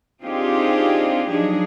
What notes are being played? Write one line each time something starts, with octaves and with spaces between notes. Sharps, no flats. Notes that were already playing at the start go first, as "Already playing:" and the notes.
C4 D4 D#4 F4 G4 G#4
F3 F#3 D4 D#4 G#4